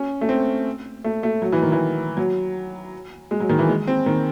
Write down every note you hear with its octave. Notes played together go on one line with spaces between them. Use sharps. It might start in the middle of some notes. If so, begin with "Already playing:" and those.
Already playing: C#4
A3
C4
A3
A3
F#3
E3
D#3
E3
F#3
G#3
F#3
D#3
E3
G#3
C4
D#3